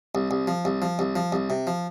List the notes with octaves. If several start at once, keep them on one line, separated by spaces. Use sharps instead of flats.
C2
C2
F3
C2
F3
C2
F3
C2
C3
F3